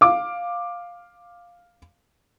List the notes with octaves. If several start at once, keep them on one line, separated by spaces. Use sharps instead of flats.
F5 D6